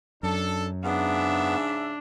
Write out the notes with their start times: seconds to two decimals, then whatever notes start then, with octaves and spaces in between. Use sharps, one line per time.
0.23 F#2 D4 A4
0.85 G#2 C#3 B3 D4 E5